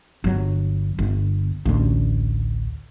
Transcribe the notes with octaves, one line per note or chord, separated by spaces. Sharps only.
G1 F#3
G1
A1 D2